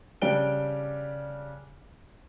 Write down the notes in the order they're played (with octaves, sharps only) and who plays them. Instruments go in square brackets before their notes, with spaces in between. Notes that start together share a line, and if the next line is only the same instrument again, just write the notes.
[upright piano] C#3 G3 D4 G5 D7 G7